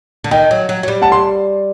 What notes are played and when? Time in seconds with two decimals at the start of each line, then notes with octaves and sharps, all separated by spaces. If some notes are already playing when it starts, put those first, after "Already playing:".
0.24 D3
0.31 D#3 D#5 G5
0.51 F#3
0.69 F#3
0.83 F#3
0.88 G3
1.02 F#5 A5
1.12 C6